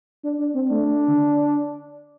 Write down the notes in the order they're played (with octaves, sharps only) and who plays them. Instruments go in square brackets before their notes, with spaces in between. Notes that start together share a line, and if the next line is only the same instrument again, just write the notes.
[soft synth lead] D4
D4
C4
[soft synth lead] A3 [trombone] D4
[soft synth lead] D3